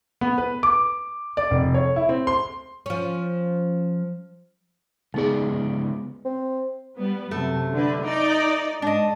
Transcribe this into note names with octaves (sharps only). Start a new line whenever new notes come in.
B3
B4
D6
D5
F1
C#5
E4
C4
C6
F3 C#4
C#2 B3 D#4 G#4 D5
C4
G3 B3
F#2 C3 A3
D3 B4
D#4 D5
G#2 D4 D#5